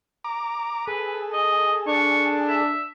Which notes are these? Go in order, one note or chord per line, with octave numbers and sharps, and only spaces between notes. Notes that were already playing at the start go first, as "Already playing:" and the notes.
A#5 D6
G#4 A4 B4
D#5
D4 C#6
E5